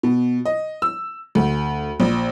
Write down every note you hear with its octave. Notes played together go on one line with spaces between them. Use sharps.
B2
D#5
E6
D2
A#1